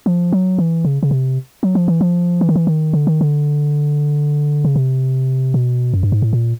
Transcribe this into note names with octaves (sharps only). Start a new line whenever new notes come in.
F3
F#3
E3
C#3
C#3
C3
F#3
F3
E3
F3
E3
D#3
E3
D#3
D3
D#3
D3
C#3
C3
B2
F#2
G2
G#2
A2
A#2